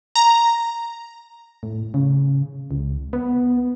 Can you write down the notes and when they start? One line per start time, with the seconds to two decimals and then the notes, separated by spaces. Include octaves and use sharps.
0.15 A#5
1.63 A2
1.94 C#3
2.71 C#2
3.13 B3